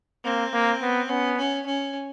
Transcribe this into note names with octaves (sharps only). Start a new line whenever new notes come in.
A#3 C4
A#3
B3
B3 C#4
C#4
C#4